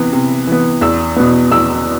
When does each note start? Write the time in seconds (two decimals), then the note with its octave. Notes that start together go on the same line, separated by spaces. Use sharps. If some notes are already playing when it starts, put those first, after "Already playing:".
Already playing: C3 E3 B3
0.13 C3
0.47 E3 B3
0.81 E2 E6
1.16 B2 B3
1.51 E2 E6